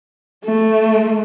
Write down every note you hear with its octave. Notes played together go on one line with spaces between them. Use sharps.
A3